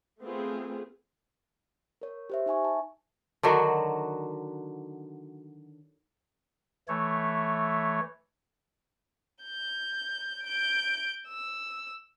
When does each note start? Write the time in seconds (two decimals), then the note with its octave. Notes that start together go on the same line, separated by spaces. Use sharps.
0.21 A3 B3 C4 F4 G#4
2.01 A#4 C#5
2.30 G4 C5 E5
2.46 D#4 E5 G#5 C#6
2.65 A5
3.43 D3 D#3 F#3 F#4
6.88 E3 A3 C#5
9.44 G6
10.44 G6 D7
11.28 E6